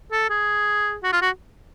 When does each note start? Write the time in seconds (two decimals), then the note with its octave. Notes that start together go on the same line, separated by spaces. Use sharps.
0.11 A4
0.30 G#4
1.03 F#4
1.13 F4
1.22 F#4